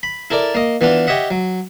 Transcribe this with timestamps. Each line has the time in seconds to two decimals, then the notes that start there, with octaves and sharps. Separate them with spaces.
0.03 B5
0.30 E4 A4 A#4 D5
0.55 A#3 D#5
0.81 E3 B3 D4 F4
1.07 G4 C#5 D#5 E5 F#5
1.30 F#3